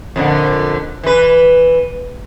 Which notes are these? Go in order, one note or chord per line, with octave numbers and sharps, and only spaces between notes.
F2 A#2 D3
E3 B4